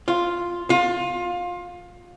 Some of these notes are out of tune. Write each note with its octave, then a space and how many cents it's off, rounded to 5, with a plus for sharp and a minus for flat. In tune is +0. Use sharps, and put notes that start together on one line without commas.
F4 +0
F4 +20